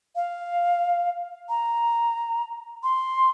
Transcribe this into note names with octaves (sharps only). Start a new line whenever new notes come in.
F5
A#5
C6